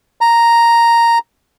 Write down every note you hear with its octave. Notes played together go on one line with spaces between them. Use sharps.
A#5